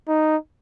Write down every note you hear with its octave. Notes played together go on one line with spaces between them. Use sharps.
D#4